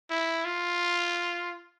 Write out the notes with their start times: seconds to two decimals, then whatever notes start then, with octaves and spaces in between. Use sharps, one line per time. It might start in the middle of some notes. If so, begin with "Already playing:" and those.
0.10 E4
0.45 F4